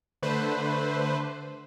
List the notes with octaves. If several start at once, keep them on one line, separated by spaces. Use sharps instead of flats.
D3 A3 B4 C5